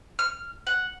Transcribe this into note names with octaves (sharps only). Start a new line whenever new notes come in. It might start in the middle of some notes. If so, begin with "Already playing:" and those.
F6
F#5